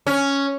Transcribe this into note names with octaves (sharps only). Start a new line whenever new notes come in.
C#4